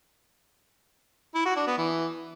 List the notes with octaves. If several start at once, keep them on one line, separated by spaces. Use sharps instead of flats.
E4
F#4
D4
B3
E3